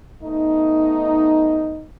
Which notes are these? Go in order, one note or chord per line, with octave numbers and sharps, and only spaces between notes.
A3 B3 D#4